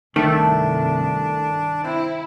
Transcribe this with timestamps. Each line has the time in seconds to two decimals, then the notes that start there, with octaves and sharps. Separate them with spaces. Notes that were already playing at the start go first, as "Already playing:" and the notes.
0.16 C2 G2 D#3 A3 D4
1.84 C4 E4